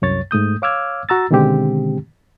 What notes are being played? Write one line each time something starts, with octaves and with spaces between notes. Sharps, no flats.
C2 F#2 C#5 A6
G#2 A3 D#6 G6
C#5 F5 D6 E6 F6 G#6
F#4 A#5 E6 A6
B2 D3 D#3 G#3 C4 G4